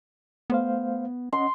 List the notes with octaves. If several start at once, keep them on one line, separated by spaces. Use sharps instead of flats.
A3 B3 C5 F5
C#4 D#5 F#5 C6